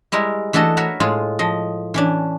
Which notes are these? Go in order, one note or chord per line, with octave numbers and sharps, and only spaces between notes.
G3 G#3 E4 A#4
E3 A3 D4 F#4 A4 D#5
F#4 A#4 B4 C#5 E5 F#5
A2 G#3 F4 G#4
F3 D#5
E3 C#4 D4